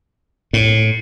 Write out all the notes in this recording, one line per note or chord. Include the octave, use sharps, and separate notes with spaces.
A2